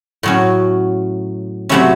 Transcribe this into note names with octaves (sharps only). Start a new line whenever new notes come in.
A2 F#3 C#4
C3 F#3 A3 C#4 E4